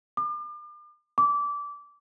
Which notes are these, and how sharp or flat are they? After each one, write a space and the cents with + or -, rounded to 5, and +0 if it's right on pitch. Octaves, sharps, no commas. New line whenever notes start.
D6 +40
D6 -20